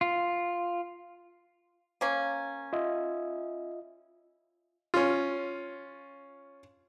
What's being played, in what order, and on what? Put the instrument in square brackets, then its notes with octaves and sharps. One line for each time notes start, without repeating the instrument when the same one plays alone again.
[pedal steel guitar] F4
[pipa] A#3 C#4
[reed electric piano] F4 D#5 E5
[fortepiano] C#4 F4